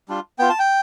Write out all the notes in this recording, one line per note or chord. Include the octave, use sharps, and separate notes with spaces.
G3 D4 F4
B3 F4 G5
A5
G5